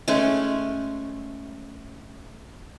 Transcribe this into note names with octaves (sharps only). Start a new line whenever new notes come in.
G#3 A3 C#4